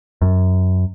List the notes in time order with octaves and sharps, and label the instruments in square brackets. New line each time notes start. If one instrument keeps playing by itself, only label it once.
[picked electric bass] F#2